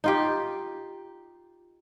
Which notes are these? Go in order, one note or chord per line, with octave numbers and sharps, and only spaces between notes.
D#4 F4 G4